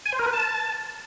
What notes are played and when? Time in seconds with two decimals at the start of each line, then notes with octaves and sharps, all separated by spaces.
0.06 G#5
0.12 C5
0.19 A#4
0.26 B4
0.33 A5